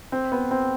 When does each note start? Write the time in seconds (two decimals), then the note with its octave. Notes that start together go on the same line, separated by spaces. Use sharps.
0.12 C4
0.32 B3
0.51 C4